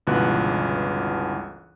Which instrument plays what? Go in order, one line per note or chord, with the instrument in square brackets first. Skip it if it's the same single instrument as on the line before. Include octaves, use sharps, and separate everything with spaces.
[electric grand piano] G1 C#2 B2 E3 F#6